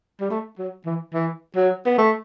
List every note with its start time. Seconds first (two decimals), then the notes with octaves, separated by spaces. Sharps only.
0.21 G3
0.30 A3
0.59 F#3
0.86 E3
1.14 E3
1.56 F#3
1.86 B3
1.98 A3